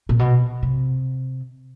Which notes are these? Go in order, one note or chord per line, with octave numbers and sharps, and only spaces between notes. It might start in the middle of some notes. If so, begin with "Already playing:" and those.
A#2
B2
C3